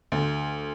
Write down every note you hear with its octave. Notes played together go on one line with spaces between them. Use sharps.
D2